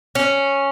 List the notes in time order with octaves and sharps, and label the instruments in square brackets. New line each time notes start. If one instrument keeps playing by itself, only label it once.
[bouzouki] C#4